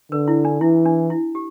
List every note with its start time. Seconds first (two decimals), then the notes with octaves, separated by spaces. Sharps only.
0.12 D3 B4
0.28 E4
0.45 D4
0.61 E3 E4
0.85 D4
1.10 E4
1.35 G4